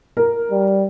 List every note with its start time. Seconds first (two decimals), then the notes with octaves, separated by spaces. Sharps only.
0.17 A#4
0.51 G3